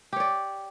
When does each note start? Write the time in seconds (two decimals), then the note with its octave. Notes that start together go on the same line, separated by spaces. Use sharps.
0.13 G4
0.16 C#5
0.20 D5